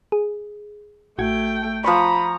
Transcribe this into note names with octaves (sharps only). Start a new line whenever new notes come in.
G#4
A1 A3 F#4 G5 G#6
F3 A#5 B5 C#6